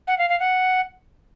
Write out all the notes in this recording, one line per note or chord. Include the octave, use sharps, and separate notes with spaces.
F#5
F5
F5
F#5